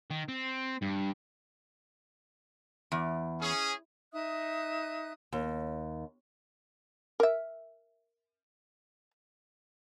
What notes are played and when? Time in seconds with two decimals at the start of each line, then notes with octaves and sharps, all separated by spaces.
0.11 D#3
0.28 C4
0.82 G2
2.92 E2
3.41 C#4 G#4
4.13 D#4 E5 D#6 F#6
5.32 D#2
7.20 A#4 E5